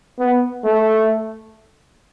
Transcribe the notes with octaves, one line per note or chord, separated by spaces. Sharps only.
B3
A3